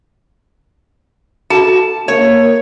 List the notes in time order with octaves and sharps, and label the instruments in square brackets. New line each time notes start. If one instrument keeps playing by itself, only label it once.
[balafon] F#4 A4 [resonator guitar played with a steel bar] A5
[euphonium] A#3 [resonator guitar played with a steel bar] C#5